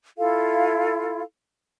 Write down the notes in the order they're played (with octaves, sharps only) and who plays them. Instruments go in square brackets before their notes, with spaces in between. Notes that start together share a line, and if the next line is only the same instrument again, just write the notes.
[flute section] E4 F4 A4 F5